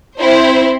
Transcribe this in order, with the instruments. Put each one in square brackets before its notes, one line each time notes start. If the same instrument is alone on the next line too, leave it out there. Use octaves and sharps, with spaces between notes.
[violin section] C4 E4 C5